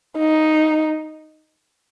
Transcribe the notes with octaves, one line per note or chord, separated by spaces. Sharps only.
D#4